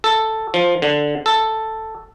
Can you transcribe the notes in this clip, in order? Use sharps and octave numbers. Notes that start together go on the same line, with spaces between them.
A4
F3
D3
A4